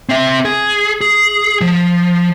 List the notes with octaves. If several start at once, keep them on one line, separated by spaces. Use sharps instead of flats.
C4 E5
G#4
G#4
F3